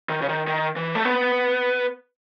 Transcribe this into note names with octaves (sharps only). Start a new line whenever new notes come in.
D#3
C#3
D#3
D#3
E3
A3
B3